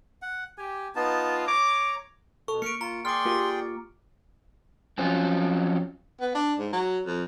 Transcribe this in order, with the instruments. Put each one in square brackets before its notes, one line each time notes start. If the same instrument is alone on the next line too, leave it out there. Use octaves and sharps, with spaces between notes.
[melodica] F#5
[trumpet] G4 [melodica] G#5
[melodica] B3 D#4 A5 [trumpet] F4
[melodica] C#5 A#5 [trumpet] D6
[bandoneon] B2 [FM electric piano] A4 [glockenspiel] C#6
[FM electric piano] A#3 [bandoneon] C#6 F6 [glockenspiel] C#7 D7
[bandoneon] F4 [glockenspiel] A#5
[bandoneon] G#4 D5 G5 [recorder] C6 [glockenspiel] D6 F6
[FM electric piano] A#3 F4 G4
[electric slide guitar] F3 F#3 C4 [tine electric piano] C#4 F5
[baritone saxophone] B3
D4
G#2
F#3
F2